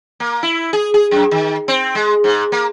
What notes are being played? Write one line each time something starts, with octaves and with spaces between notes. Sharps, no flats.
A#3
E4
G#4
G#4
F#2
D#3
C4
G#3
G#2
A#3